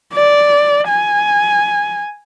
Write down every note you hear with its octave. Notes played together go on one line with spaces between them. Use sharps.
D5
G#5